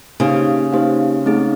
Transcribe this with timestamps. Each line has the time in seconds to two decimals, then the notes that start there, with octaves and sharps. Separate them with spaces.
0.20 C#3 A#3 D#4 G4 C5 F5
0.73 A#3 D#4 G4 C5 F5
1.26 A3 C4 D#4 G#4